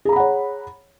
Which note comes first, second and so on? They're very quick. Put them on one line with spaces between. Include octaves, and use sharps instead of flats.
G#4 A#5 B5 F#5 C#5